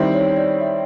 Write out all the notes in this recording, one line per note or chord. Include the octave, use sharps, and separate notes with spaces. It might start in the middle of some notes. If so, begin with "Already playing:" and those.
Already playing: D#3 G3 C4 E4
C#5
D5
E5